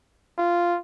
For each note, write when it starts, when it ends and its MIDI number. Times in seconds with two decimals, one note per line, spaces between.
0.38 0.78 65